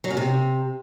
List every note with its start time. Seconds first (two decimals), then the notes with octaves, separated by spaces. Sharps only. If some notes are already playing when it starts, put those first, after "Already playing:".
0.04 F#3
0.10 F#2
0.17 C3